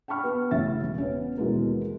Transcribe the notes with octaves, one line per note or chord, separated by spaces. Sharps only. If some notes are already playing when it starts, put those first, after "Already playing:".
G5 A5 B5 C#6 F6
B3
A1 C#3 E5 A6
E1
B3 C#4
D#1 B2 E3 G#3 F#4 A#4